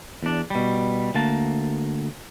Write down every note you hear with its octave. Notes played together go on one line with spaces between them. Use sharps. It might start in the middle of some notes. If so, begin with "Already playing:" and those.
E2 D4
B2 G3
D2 A#3 A5